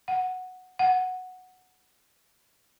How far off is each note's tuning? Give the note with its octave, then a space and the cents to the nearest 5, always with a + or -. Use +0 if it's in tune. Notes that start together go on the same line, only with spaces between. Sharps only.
F#5 -5
F#5 -5